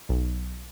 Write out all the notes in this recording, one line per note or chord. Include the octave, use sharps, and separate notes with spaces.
B1